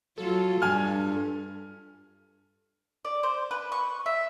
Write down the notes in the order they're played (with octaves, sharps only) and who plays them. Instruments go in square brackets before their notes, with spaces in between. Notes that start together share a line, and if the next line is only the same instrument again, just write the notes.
[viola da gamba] F#3 F4 [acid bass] A4
[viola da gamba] G2 [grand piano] G#5 F6
[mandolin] D5
C5
B4
C#6
E5